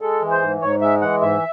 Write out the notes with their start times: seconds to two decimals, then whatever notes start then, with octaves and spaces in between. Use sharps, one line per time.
0.01 G#3 A4
0.22 E3
0.31 C5
0.42 G#2
0.61 G#2 C#5
0.81 G#3 E5
1.01 E3 F#5
1.21 G#2 E5